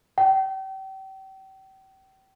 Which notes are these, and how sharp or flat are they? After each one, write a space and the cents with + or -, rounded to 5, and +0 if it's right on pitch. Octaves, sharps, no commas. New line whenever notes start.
G5 -35